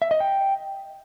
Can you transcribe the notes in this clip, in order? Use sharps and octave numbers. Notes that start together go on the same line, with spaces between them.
E5
D#5
G5